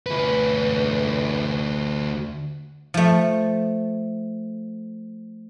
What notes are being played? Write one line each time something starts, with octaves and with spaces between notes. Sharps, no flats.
D2 B4
F3 A3